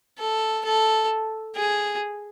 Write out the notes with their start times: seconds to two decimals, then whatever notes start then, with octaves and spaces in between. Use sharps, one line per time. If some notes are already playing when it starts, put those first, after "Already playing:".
0.19 A4
0.65 A4
1.56 G#4